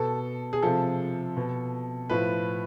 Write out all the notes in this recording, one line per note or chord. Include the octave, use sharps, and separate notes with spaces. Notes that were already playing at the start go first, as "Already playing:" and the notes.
Already playing: B2 A4
G#4
C3 F3 A4
B2
A2 F3 B4